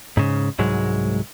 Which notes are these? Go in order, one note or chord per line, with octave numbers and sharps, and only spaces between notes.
G#2 C#3
C2 G#2 F#3 G#3